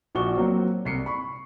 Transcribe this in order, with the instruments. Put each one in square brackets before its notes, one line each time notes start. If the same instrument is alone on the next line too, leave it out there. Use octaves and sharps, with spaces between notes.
[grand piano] A#1 F3 F#4 D5 C#6 G7
F#3 A#3 C4
C2 C7 C#7
B5 C#6